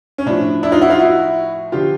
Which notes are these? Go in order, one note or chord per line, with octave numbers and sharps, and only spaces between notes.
C#4
A2 F3 D4
D4 E4
D#4 F4
E4 F#4
D#4 F4
E4 F#4
D3 F3 F4 G4